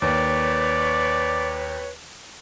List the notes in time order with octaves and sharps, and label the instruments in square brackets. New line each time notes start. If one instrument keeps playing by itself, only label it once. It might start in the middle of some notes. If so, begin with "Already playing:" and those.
[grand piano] D#2 [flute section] B4 C#5 [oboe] D5